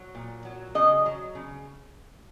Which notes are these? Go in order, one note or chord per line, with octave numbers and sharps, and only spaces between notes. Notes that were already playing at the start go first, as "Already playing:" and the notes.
Already playing: F#3
A#2
F#3
C#3 D#5
F#3
C#3